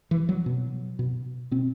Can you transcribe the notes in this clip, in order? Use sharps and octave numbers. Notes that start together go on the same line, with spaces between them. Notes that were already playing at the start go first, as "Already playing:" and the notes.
E3
F#3
B2
B2
B2 C4